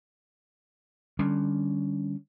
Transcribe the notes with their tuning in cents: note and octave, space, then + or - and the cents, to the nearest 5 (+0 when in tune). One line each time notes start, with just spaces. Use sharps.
D3 +25 G3 +0 C#4 +20